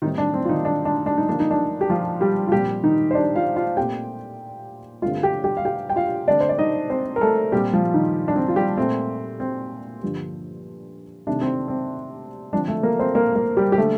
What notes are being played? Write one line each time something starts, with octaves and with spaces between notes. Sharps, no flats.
A2 D#3 G3 C4 D#4
D4
C4
F4
D#3 D#4
D4
D4
D4
D#4
D3 F3 A#3 D4
D#4
D4
G4
F3 F4
G3 G4
F4
A#2 F3 G3 C4 G4
D#3 D#4
C5
D4 D5
F4 F5
F4 F5
A#2 A3 C4 G4 G5
G2 D3 A3 C4 F4 F5
G4 G5
G4 G5
F5
G4 G5
G5
F4 F5
D3 A3 C4 D4 D5
C5
D5
D#4 D#5
C4 C5
A#4
A3 A4
A#2 G3 C4 G4
F3 F4
D#3 D#4
D4
C4
F4
G3 G4
A#2 A3 C4
C4
G2 D3 F3
C3 D#3 A3 D4
C4
C4
D3 F3 C4 D4
A3 A4
A#3 A#4
C4 C5
A#3 A#4
A#3 A#4
G3 G4
G4
D3 G3 A3 A#3 A4